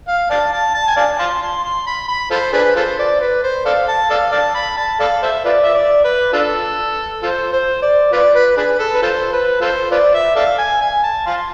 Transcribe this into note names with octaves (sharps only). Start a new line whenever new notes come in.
F5
D5 F5 A5
A5
A5
G#5
D5 F5 A5
F5 A5 C6
C6
C6
B5
B5
F4 A4 C5
D4 G#4 B4
F4 A4 C5
D5
B4
C5
A4 D5 F5
A5
A4 D5 F5
D5 F5 A5
B5
A5
A4 D5 F5
A4 C5 E5
F4 B4 D5
E5
D5
B4
D4 F4 A4
F4 A4 C5
C5
D5
F4 B4 D5
B4
D4 G#4 B4
A4
B4
F4 A4 C5
B4
F4 A4 C5
F4 B4 D5
E5
A4 D5 F5
G#5
G#5
A5
F5 A5 C6